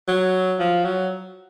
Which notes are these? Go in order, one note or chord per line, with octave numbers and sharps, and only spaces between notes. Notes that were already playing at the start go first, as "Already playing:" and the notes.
F#3
F3
F#3